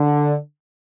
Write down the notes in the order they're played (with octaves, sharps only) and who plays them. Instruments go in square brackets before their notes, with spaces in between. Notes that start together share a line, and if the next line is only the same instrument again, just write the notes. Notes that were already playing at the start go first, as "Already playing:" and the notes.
Already playing: [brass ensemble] D3